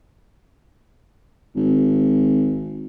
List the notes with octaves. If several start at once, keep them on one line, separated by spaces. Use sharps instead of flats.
G#1